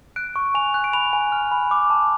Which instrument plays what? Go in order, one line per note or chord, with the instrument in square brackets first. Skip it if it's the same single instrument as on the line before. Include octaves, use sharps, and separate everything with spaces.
[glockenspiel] F#6 D7
C#6
G#5 F7
F#6
D7
B5 F7
G#5
F6
B5
D6
A5